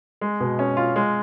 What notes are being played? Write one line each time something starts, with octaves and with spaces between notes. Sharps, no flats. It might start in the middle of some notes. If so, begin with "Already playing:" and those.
G#3
B2
C#4
F4
G#3